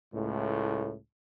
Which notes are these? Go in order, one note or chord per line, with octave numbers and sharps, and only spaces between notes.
C#2 A2